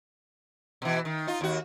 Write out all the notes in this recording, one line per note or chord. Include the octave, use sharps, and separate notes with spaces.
B2 E3
D#3
D#4 F4
D#2 F#4